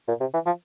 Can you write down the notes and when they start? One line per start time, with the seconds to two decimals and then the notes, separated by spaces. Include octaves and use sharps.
0.08 A#2
0.20 C3
0.34 E3
0.46 F3